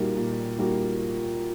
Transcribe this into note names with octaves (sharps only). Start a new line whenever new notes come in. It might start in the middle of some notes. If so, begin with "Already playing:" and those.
Already playing: A#2 G3 A#3 D#4 F#4
A#2
G3 A#3 D#4 F#4